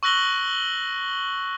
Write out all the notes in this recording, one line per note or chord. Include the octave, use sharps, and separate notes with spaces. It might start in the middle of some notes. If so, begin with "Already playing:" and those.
C#6 E6 F#6 A#6 F#7 G7